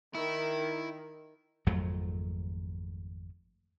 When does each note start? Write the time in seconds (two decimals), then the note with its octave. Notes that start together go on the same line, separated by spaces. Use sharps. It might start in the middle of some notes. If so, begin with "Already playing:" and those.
0.15 D#3 E4
1.66 G#1 F2 F#3 A3